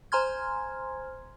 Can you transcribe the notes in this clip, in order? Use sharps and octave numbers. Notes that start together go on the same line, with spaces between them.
C5 G#5 A#5 C6 F6 G#6